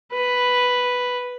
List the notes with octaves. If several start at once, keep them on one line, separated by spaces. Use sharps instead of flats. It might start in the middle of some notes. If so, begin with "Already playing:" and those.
B4